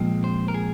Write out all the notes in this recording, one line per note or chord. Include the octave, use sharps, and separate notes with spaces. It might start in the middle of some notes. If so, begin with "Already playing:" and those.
Already playing: A#2 F3 G#3 C4
C5
A#4
G#4